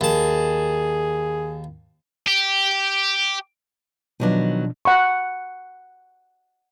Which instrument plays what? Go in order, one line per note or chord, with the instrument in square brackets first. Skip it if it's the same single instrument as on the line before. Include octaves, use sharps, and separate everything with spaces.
[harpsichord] D#2 A5 [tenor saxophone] G#4
[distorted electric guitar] G4
[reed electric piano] B2 F3 D4 [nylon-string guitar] D#3 F#3 B3
[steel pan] F#5 B5 C#6